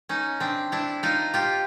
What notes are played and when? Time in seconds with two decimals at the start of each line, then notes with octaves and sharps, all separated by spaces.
0.09 C#4 D#4
0.40 C4 D4
0.72 D4 E4
1.03 D#4 F4
1.34 F4 G4